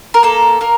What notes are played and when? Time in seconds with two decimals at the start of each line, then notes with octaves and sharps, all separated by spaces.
0.14 A#4
0.23 A#3 A4
0.61 A#3 A#4